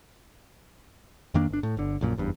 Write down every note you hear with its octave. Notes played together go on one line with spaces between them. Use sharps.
F2 D#3 A#3 D4
G1 D4
A2
G1 D3
A#1 F#2 A#2
F#1 E2 G2